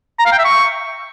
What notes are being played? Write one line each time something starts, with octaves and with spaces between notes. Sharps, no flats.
A#5
F5
G5
E5
C#6